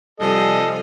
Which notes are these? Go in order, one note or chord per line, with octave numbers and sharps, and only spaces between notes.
C3 F3 G3 A4 D#5 G#5